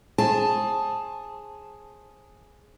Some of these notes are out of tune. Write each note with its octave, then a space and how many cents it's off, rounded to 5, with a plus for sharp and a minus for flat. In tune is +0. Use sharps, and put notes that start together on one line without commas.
G#4 +0 C5 +35 A5 +0